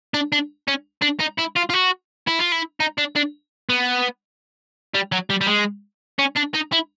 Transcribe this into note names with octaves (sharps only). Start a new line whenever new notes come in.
D4
D4
C#4
D4
D#4
E4
F4
F4
F#4
E4
F4
E4
D#4
D4
D4
B3
G3
F#3
G3
G3
G#3
C#4
D4
D#4
E4